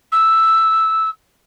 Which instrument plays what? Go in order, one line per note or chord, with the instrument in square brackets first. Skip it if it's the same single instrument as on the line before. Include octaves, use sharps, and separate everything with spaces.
[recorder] E6